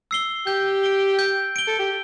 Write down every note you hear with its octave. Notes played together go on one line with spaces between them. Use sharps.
E6 C7 G7
G4 G6
D7 G7
G6
D7 G7
A4
G4